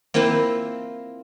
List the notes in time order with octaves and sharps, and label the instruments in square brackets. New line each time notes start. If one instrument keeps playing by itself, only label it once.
[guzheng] A#3 C4 E4 F4 C5